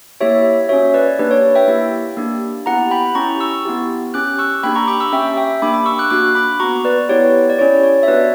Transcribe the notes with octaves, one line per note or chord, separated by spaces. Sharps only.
A#3 E4 G4 C#5 E5
C#4 F#4 C#5 E5
B4 D5
A#3 D4 G4 B4
C#5
E5 G5
A#3 E4 G4
A#3 D4 G4
B3 E4 G4 F#5 A#5
G5 B5
C#4 E4 G4 A#5 C#6
C#6 E6
B3 E4 G4
C#4 G4 D6 F#6
C#6 E6
A#3 D4 G4 G5 B5
A#5 C#6
B5 D6
C#6 E6
C#4 G4 E5 G5
E5 G5
A#3 D4 G4 B5 D6
B5 D6
C#6 E6
D6 F#6
A#3 D4 F#4 D6 F#6
B5 D6
B3 F#4 A#5 C#6
B4 D5
B3 E4 G4 C#5
D5
C#4 E4 G4 C#5
C#5
E5
B3 D4 F#4 B4 D5